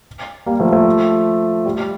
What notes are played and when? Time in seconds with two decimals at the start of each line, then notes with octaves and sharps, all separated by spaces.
0.46 G3 A#3
0.60 F3 A3
0.72 F3 A3
1.66 G3
1.78 G3